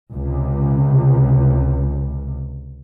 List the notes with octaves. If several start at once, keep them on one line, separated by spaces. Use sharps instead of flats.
C#2 C3